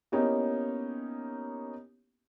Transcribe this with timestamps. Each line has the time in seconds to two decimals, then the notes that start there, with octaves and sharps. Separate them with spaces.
0.12 A#3 B3 C#4 D#4 E4 G4